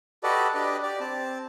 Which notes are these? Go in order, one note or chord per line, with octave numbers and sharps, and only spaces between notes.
F#4 G4 A4 B4 D5 D#5
D4 G4 B4 D5 D#5
G4 D5
C4 A5